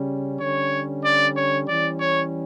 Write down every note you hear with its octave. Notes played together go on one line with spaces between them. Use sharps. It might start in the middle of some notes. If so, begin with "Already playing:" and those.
Already playing: C#3 G3 C#4
D3 G3 C#4 C#5
D5
C#5
E3 G3 C#4 D5
C#5